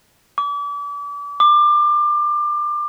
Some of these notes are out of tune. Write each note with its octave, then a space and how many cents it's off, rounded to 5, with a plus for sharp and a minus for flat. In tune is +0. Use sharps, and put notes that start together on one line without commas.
D6 -35
D6 +25